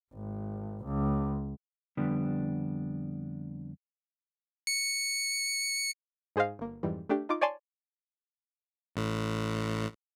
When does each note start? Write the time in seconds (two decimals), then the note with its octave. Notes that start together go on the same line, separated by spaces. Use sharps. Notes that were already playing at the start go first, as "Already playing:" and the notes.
0.14 G#1
0.85 C#2
1.97 F2 D3 G3 B3 D4
4.67 C#7
6.36 G#2 G#4 C5 D#5 F5
6.59 G1 A#3
6.83 F2 G#2 E3 G3
7.09 A3 D4 G4
7.29 D#4 F4 D6
7.41 C#5 D5 G#5 A5 C6
8.96 A1 A2